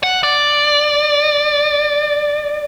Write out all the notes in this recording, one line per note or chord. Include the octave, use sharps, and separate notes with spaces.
F#5
D5